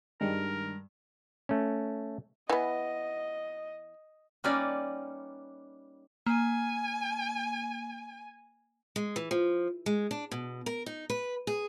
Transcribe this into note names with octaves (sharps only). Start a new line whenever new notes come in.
G2 D#3 G3 G#3 A#4
A3 C#4
E3 B3 D#5
G3 A#3 C#4 D#4 B4 D5
A#3 G#5
G#3
E3
F3
G#3
D4
B2
A#4
D#4
B4
G#4